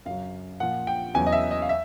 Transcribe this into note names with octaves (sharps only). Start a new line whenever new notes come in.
F#2 C#3 F#3 F5
A#2 F3 F#5
G5
E2 C#3 F#3 G#5
D#5
E5
D#5
F5
E5